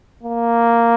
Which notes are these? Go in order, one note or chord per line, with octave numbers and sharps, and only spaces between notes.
A#3